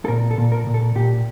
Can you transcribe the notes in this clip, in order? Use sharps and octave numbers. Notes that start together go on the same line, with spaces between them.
A4
A#2 A#4
A4
A#2
A#4
A#2
A4
A#2 G4